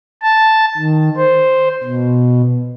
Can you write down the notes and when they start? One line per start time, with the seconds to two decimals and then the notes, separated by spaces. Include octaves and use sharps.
0.22 A5
0.77 D#3
1.17 C5
1.83 B2